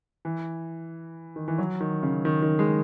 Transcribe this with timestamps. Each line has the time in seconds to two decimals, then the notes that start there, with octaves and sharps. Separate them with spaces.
0.25 E3
1.36 D#3
1.48 E3
1.58 F#3
1.81 D#3
2.03 C#3
2.25 D#3
2.42 D#3
2.59 G#3